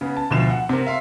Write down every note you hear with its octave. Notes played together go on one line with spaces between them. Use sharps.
C#3 B3
A5
D2 B2 F3 E7
F#5
C3 C4 A#4
E5 F5 C6